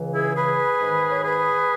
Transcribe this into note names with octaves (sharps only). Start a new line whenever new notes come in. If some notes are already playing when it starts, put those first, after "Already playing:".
Already playing: C#2 C#3 E3
E4 G#4
G#4 B4
G#2 D#3
C#5
G#4 B4